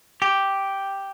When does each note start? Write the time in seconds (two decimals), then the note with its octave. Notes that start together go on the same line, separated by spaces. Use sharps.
0.22 G4